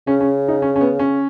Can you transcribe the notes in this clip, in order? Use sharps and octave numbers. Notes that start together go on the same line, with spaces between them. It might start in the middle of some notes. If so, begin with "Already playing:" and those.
C#3 C#4
C#4
D#4
C#4
C#4
B3
C#4